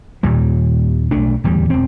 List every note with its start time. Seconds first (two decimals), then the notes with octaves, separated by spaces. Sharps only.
0.23 D#2 A#2 G3
1.11 B1 A3 D4
1.44 D1 E2 G3
1.70 E1 C4